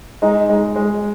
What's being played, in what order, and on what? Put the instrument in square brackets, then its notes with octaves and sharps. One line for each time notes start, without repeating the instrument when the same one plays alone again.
[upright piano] G#3 [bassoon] D#4
[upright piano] G#3
G#3